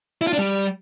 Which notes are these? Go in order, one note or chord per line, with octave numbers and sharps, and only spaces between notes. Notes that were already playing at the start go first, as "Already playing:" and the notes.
E4
F4
D4
G3